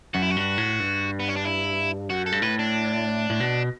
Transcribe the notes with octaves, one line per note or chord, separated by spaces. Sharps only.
F#2 F#4
E4
F#4
G2
A2
G2
B3
C#4
D4
E4
F#2 F#4
A4
G2
A2 B4
D4
A2
B2